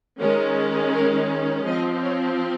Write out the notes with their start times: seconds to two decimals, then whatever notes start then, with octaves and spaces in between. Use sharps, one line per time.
0.19 D#3 G#3 C#4 A#4
0.93 A#4
1.65 F3 C4 D#5
2.03 C#5